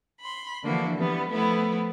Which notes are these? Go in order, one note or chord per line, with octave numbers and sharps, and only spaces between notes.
B5 C6
D3 E3 F3 A#3 D4 F#4
E3 G3 B3
F3 A3 B3 E4